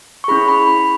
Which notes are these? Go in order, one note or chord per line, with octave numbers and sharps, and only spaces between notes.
C#6
C#4 E4 G#4 B5
B5
B5